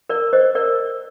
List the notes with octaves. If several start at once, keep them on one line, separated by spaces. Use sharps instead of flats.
A#4 D5
C5 D#5
A#4 D5